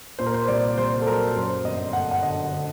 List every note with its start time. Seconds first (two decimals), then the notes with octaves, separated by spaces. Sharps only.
0.19 A#2 C5
0.26 A#4
0.34 C5
0.48 C2 D5
0.78 C2 C5
1.01 A4
1.06 F#3 A#4
1.36 F#2 C5
1.64 G1 D#5
1.93 A3 F#5
2.11 F#5
2.22 D3 D#5
2.52 D3